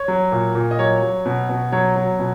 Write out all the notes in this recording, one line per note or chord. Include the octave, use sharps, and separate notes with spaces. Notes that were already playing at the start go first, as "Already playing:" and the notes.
Already playing: C#5
F#3
A#2
A#2
D#5
F#3 C#5
F#3
B2
B2
F#3 C#5
F#3
B2